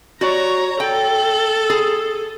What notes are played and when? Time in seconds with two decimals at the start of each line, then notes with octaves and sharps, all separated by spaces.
0.21 F#4 C#5 D5 A#5
0.80 A4 G5
1.70 G#4